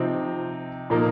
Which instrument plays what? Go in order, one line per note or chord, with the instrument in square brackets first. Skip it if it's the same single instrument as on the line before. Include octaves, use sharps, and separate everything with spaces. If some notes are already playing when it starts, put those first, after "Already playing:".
Already playing: [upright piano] C3 F3 C4 D#4
A#2 F3 A#3 D#4